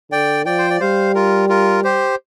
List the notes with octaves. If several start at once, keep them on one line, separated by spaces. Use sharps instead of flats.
D3 D5 G5
F3 D5 G5
C5
D5
G3 C5 F5
F4 A#4
F4 A#4
G4 C5